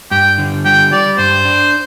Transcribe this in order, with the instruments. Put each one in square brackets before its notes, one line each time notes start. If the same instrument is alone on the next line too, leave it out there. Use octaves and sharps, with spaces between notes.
[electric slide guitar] G2 [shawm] G5
[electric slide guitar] D3
[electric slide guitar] G3 [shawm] G5
[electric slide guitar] G3 [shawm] D5
[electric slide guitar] G2 [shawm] C5
[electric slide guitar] D4